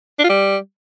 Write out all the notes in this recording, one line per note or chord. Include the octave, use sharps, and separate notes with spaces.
D4
F4
G3